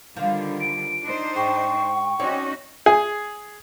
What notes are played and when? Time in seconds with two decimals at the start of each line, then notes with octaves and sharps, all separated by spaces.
0.17 D3 D#3 F3 G3
0.61 D7
1.03 D4 D#4 C5
1.36 G#2 G5 C#6
2.19 C4 C#4 D#4 F#4 C#5 D5
2.86 G#4